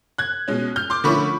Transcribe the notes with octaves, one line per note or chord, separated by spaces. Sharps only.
F#6 G#6
B2 G#3 C#4
F6 G6
C6 D6
D3 F3 A3 C#4 E4 B5 C#6